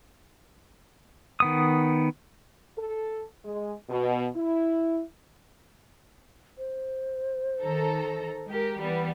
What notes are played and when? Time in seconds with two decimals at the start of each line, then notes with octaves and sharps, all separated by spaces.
1.40 D#3 B3 D#6
2.77 A4
3.44 G#3
3.89 B2
4.35 E4
6.58 C5
7.61 D#3 A4 A#5
8.49 G#3 G4 A#4
8.80 E3 G3 B3